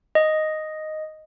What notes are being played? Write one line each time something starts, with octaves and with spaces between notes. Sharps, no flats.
D#5